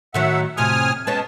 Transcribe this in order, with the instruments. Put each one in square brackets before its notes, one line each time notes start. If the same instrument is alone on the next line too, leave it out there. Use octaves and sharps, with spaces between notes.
[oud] A2 D#3 F#3 [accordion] E5 F#5
[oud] F2 A2 C3 [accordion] G#5 D#6 F6
[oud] G#3 B3 C#4 [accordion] A5